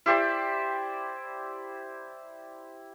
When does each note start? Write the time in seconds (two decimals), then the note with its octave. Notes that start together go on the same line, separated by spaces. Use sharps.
0.06 E4 G4 C5 D5